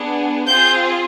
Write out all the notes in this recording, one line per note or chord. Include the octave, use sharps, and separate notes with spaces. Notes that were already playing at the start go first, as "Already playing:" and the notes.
Already playing: B3 D4 G#4
C4 F4 G#4 G6